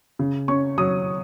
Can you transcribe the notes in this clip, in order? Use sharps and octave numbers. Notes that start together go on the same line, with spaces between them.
C#3
C#4 C#6
F#3 D#6